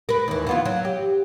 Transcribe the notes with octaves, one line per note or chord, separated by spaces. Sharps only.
A#4 B4
D#2 E3
E3 B3 F4
F#3
G4